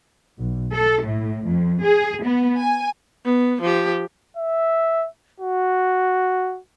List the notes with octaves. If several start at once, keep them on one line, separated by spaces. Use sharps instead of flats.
B1
A4
A2
F2
G#4
B3
G#5
B3
F3 G4
E5
F#4